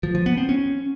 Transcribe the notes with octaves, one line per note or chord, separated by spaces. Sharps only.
F3
F3
B3
C4
C#4